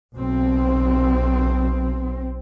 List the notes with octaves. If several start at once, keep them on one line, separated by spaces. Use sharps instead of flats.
B1 C4